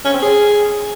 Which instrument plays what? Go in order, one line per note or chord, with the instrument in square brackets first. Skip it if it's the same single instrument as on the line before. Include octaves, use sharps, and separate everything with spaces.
[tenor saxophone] C#4
C4
G#4